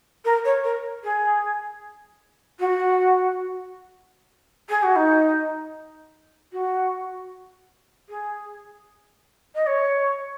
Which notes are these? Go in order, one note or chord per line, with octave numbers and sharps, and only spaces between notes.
A#4
C#5
A#4
G#4
F#4
G#4
F#4
D#4
F#4
G#4
D#5
C#5